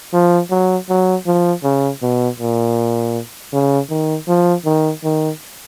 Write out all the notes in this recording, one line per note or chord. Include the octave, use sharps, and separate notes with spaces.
F3
F#3
F#3
F3
C#3
B2
A#2
C#3
D#3
F3
D#3
D#3